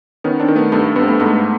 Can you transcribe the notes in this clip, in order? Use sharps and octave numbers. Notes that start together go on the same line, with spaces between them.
D#3 B3 C#4
C4 D4
D#3
A3 B3
G2 A3 B3
G2 A3 B3
C4
A3 B3
G#2 A3 B3